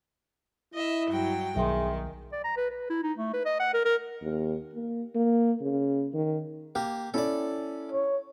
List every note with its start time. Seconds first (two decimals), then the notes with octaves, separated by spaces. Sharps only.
0.74 E4 D#5 E5
1.08 G2 F#3 G5
1.56 B1 D#3 G#4 E5 G5 C6
2.33 D5
2.44 A#5
2.57 B4
2.71 B4
2.90 E4
3.03 D#4
3.18 A3
3.34 B4
3.46 D#5
3.60 F#5
3.74 A#4
3.85 A#4
4.22 D#2
4.74 A#3
5.15 A#3
5.61 C#3
6.14 D#3
6.75 A#3 G4
7.14 C#4 E4 A4 D5
7.92 C#5